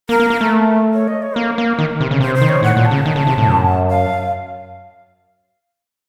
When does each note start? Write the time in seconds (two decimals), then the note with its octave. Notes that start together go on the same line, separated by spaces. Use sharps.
0.09 A#3 A#4
0.20 A#3
0.30 A#3
0.41 A3
0.94 C#5
1.08 D#5
1.22 C#5
1.36 A#3 A#4
1.58 A#3
1.79 D#3
2.00 C3
2.11 C#3
2.20 C3 C5
2.35 C5
2.42 D#3
2.49 C#5
2.63 A2 F#5
2.77 A#2
2.85 A5
2.91 C#3
3.06 D#3
3.16 C#3
3.27 C3
3.38 A2
3.47 F#2
3.90 F5